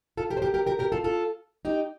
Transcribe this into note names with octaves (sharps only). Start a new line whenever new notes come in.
F4 A4
G4 A#4
C5
G4 A#4
G4 A#4
G4 A#4
G4 A#4
F4 A4
F4 A4
D#4 G4